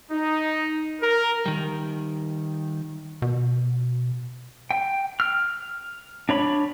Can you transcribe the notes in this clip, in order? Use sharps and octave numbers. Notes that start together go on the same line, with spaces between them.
D#4
A#4
D#3 G3
B2
G5
F6
D4 C#5 B5